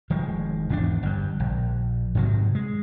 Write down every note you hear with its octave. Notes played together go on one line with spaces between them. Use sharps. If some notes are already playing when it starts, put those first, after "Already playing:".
F1 D#3 F3 G#3
G#1 E2 C#4 D4
G1 G2
A#1
G#2 C3 D#3 F#3
G#3